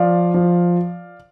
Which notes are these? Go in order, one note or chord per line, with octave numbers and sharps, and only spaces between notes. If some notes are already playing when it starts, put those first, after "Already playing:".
Already playing: F3 D5 F5
F3